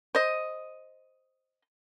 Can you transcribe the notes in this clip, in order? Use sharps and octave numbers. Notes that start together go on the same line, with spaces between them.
C5 D#5